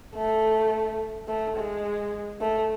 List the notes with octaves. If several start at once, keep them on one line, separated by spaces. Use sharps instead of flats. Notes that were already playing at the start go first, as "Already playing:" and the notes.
A3
A3
G#3
A3